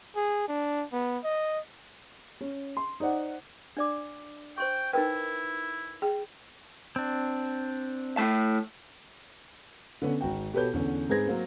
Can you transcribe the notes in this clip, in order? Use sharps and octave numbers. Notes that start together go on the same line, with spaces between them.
G#4
D4
B3
D#5
C#4
C6
D#4 C5 D5 F#5
D4 D5 D6
C5 G5 C6 C#6
D#4 E4 A#4 B4 G5
G#4 G5
C4 D4
A2 A3 A5
D3 B3 C#4
G#1 F#4 G5
B2 G4 A4 B4 C#5 G6
E2 D3 C#4
G#2 C4 G#4 B4 G#6 A#6
F#3 A#3 C4